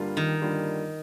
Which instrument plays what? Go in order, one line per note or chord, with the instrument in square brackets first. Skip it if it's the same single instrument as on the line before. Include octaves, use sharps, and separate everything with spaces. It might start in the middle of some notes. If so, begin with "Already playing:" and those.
Already playing: [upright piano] G2 D3 G3 A#3 F4
[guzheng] D#3
[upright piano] G2 D3 G3 A#3 F4